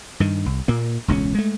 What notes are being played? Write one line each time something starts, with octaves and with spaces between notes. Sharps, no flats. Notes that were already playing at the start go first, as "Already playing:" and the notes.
G2 D#3
C2
A#2 A#3
E1 C#2 C4 C#4
G#3 A3